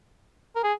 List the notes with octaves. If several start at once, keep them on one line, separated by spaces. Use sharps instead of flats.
A#4
G#4